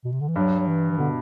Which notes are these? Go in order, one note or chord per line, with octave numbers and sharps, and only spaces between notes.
B2
C3
D3
E3
G2 F#3
F#3
E3
E3
B2 D3